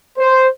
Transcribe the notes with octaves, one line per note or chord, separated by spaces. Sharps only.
C5